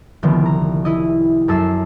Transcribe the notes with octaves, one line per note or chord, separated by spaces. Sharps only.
C2 D3 D#3 F3 B3
A#5
E4 D#5
F#2 A4 E6 C7